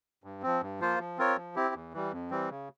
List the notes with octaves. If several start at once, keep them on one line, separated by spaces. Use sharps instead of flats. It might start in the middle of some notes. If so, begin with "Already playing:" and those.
G2
F3 C4
G2
F3 A#3 F4 C5
F3
C4 F4 A#4 C#5
F3
C4 E4 G4
E2
E3 G3
F2
E3 G3 C4
C#3